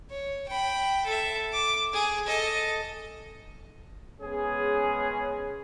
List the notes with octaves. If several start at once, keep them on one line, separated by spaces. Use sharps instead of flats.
C#5
G5 B5
A4 E5
D6
G#4
A4 D#5
G#3 B3 C#4 G#4